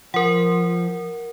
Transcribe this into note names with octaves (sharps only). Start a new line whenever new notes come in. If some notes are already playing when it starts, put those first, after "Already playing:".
F3 A#4 F#5